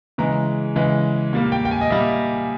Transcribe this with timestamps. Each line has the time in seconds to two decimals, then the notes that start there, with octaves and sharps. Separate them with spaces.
0.18 C#3 E3 G#3 A#5
0.76 C#3 E3 G#3
1.33 A#2 G3 A#3
1.52 G5
1.65 G5
1.71 G#5
1.81 D#5
1.90 A#2 G3 A#3 E5